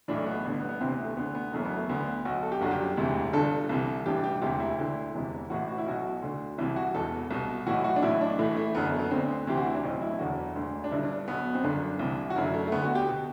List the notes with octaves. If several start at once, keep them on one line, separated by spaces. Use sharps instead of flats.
B1 A2 E3 D4
A3
B3
A1 G2 D3
B3
B3
D2 C3 E3 C4
B3
A3
D2 D3 B3
B3
F#1 F#2 E3 A3
B3
A3
D2 D3 B3
B3
B1 B2 F#4
A4
G4
G1 F#2 D3 F#4
G4
E1 D2 C3 E3
G1 G2 D3 A4
C2 C3 E3
A1 G2 E3 G4
G4
E1 D2 C3 E3 G4
E4
D2 D3 E4
E1 E2 C3 E3
A1 A2 E3 F#4
F#4
E4
B1 B2 F#4
D2 D3
C2 C3 E3 E4
F#4
E1 E2 B2 A4
C2 B2
B1 A2 E3 F#4
F#4
D4
B1 A2 E3 E4
D4
A1 A2 E3 A3
A3
F#1 F#2 D3 B3
A3
B3
D2 D3 C4
D2 C3 E3 G4
F#4
E4
D4
B1 A2 E3 C4
E4
F#1 E2 D3 F#4
E1 D2 D3
D4
G1 G2 D3 E4
D4
B1 B2 B3
C4
G1 F#2 D3 D4
C2 C3 E3
F#4
F#1 F#2 D3 E4
A3
A3
D2 D3 B3
F#4
G4
B2